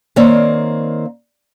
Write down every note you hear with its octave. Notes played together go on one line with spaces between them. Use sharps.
D#3 A#3 C4 C#5 D5